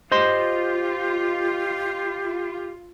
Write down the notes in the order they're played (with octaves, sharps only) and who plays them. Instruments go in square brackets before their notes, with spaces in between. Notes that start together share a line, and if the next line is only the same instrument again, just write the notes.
[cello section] F4 [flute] G4 [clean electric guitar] C5 D#5 C6